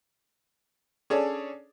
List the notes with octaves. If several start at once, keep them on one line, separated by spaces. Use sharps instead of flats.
C#4 D4 G#4 A4 C#5 D5